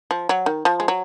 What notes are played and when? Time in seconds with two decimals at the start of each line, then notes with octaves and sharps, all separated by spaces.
0.11 F3
0.29 F#3
0.46 D#3
0.65 F3
0.80 G#3
0.88 F#3